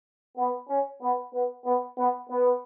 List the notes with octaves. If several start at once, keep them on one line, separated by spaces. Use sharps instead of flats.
B3
C#4
B3
B3
B3
B3
B3